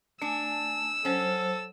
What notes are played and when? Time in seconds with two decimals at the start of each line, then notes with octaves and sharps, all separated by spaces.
0.22 A3 D4 G#5 E6
1.05 F#3 C#4 A4 C5